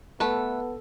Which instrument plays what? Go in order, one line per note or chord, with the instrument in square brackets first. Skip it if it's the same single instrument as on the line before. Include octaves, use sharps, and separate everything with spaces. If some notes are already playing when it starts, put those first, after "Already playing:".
[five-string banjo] A3 B4 [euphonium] B3 [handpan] A4